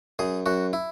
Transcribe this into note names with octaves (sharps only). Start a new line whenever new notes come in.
F#2 G#4
F#2 F#4
E4